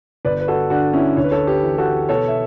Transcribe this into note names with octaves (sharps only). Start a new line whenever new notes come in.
G1 B4 D5
B4
F#4 A4
D3 D4 F#4
C#4 E4
D2 C#5
B4
A4 C#5
G4 B4
E3
F#4 A4
B2 A4 C#5
E5